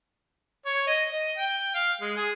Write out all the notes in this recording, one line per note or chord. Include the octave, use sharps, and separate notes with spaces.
C#5
D#5
D#5
G5
F5
G#3
G#4